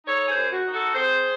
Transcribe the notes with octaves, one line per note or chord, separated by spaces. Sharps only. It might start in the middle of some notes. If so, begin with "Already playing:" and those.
D#4 A4 C#5
G#4 C5
F#2
F#4
D#4
F#4 A4
C4 G#4 C5